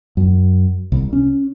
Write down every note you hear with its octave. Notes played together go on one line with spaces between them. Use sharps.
F#2
C2
C#4